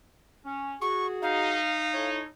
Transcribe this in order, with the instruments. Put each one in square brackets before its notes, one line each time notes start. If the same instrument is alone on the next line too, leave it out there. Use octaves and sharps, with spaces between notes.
[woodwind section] C#4
[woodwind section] F#4 G#4 [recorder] C#6
[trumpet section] D#4 [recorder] F5
[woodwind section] E4 A4 C#5